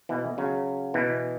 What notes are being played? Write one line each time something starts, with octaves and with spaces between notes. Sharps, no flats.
B2 E3
C#3 F#3
B2 E3